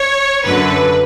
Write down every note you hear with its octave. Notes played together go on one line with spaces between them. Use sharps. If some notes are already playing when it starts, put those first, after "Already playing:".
Already playing: C#5
F#2 D3 F#3 B4